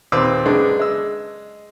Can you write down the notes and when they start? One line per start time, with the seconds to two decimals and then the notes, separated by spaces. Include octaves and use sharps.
0.12 D#2 A#2 C4 B4 D6 E6
0.45 F#2 C#3 G#3 B3 D4 G#4
0.79 G#3 E6